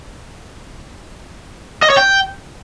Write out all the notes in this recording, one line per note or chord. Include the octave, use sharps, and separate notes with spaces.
D#5
C#5
G5